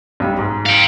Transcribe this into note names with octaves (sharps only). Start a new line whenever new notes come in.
B1 G3
G#2
F5 G5